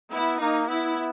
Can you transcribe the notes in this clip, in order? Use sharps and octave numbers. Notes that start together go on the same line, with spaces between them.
B3 E4
A#3 D#4
B3 E4